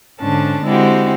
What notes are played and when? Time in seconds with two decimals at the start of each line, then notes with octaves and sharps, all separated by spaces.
0.20 G#2 D3 C#4 D4 A5
0.65 D3 G#3 C4 E4 F#4 G4